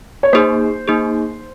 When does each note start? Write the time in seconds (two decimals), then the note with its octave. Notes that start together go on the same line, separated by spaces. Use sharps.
0.23 C#5
0.33 A#3 D#4 G#4 C5
0.87 A#3 D#4 G#4